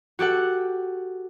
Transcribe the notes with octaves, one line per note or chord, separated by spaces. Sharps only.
F#4 G4 A4 F#5